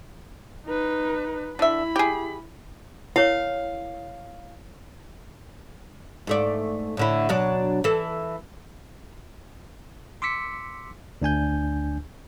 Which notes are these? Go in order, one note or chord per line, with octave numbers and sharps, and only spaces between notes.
D#4 B4
D3 E4 E5 B5
G4 G#4
E4 A#4 C#5 F5
G#2 A3 D5
A2 D3 E4
B2 F#3 D4
E3 A4
C6 D6 E6 B6 C#7
D2 D4 G#5 G6